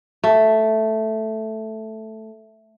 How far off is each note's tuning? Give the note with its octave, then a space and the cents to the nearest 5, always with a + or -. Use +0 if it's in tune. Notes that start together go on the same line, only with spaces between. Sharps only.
A3 +0